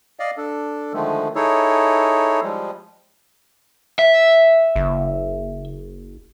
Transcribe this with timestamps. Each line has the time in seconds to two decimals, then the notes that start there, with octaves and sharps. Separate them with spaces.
0.20 D5 D#5 F5
0.37 D4 A4
0.94 D3 D#3 F3 G#3 A3
1.35 D#4 E4 G#4 A4 C#5
2.43 F3 G3 G#3
3.99 E5
4.76 F#1